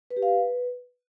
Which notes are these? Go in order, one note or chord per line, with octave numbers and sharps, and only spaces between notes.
B4
G4
F5
B4